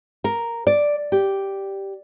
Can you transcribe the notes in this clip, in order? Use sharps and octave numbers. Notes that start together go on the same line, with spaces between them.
A#4
D5
G4